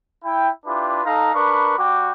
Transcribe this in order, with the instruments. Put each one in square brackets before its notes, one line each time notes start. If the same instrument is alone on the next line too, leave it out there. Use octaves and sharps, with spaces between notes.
[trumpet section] E4 G5
D4 E4 F4 G4 B4
D#4 A4 F5 A#5
D4 A#4 B4 B5 C#6
G3 F#4 G5 D6